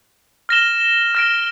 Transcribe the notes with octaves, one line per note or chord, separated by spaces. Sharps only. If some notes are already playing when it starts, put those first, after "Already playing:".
F6 A#6 E7 G7
F6 A#6 D7